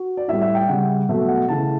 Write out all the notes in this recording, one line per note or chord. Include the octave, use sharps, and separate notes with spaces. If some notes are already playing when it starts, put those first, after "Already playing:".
Already playing: F#4
D5
A2 G3 E5
E5
G5
C#3 G3 F#5
B2 F#3 A3 E5
F#5
C#3 E3 A3 A5